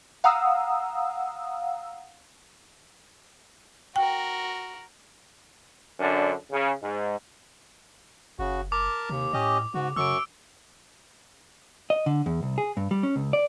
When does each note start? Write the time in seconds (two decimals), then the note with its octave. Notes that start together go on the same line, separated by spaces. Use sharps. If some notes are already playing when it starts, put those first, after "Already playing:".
0.24 F5 F#5 A#5 D#6 E6
3.96 F#4 A#4 G5
5.99 F#2 D3 D4
6.52 C#3
6.82 G#2
8.39 F#1 C#3 F#4
8.72 A#4 A5 D6
9.10 D#2 C3
9.33 A2 C#4 G4 D#5
9.74 G#2 C#3 F#4
9.96 F#2 C#3 C#6 E6 D7
11.90 D#5
12.06 D3
12.26 E2
12.43 C2
12.58 G#4
12.77 G2
12.91 G3
13.03 C#4
13.16 C#2
13.33 D5